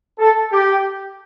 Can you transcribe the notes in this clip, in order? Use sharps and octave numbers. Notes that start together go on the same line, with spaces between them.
A4
G4